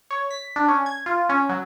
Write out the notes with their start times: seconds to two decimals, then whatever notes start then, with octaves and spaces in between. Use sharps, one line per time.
0.11 C#5
0.31 B6
0.56 D4
0.68 C#4
0.86 G#6
1.06 F4
1.29 C#4
1.49 F#3